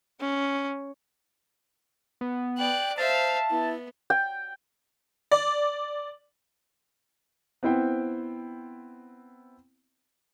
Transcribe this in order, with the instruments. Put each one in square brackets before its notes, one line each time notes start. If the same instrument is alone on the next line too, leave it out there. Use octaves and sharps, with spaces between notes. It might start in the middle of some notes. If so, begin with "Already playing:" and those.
[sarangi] C#4
[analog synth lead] B3
[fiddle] D5 F#6 [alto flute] G5
[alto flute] C5 [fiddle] E5 F5 [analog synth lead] A5
[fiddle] B3 [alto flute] E4
[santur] G5
[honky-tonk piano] D5
[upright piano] B3 C4 E4 C5 G5